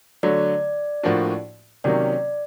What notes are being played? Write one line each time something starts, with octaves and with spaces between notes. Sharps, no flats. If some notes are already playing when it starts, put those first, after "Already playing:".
D3 F#3 A3 D5
A2 F3 A#3 D4 F#4
C3 D#3 F#3 A#3 C#4 D5